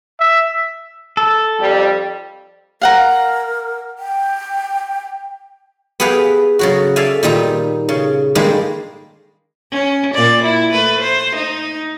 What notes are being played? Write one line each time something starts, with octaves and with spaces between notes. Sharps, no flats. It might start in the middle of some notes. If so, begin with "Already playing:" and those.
E5
A4
F2 G3
A#4 F5 F#5 A#5
G5
B3 G4 G#4 B4 F5 G5
C#3 F#3 F#4
A4 D5 E5 F5 G#5
A#2 D#3 G3 D#4
C#3
D#3 G3 G#3 A#3 D4
C#4
A#2 D5
E4
A3 B4
C5
D#4